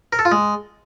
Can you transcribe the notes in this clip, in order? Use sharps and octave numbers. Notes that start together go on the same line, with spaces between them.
A#4
A4
F4
G#3